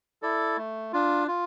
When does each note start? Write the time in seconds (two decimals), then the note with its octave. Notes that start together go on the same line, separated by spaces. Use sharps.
0.22 E4 A4 D5
0.57 A3
0.93 D4 F4
1.28 F4